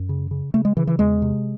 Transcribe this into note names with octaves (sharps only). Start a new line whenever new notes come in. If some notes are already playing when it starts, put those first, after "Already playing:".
Already playing: F#2
C#3
C#3
C#3 A3
G#3
C#3 E3
E3
E2 G#3
C3